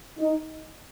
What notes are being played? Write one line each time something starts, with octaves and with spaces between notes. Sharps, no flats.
D#4